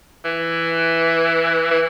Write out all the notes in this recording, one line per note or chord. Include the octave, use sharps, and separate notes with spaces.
E3
E3